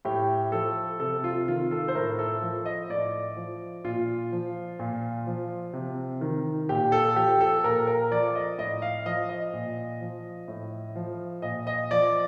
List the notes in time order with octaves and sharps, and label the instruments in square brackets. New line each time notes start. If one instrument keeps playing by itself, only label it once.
[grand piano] A2 G4
F3 A4
C3 A4
F4
D#3 F4
A4
C5
A2 A#4
A4
F3
D#5
A2 D5
F3
A#2 F4
F3
A#2
F3
C3
D#3
A#2 G4
A4
F3 G4
A4
A#2 A#4
A#4
F3 D5
D#5
A2 D#5
F5
F3 D#5
D#5
A#2
F3
A2
F3
A#2 D#5
D#5
F3 D5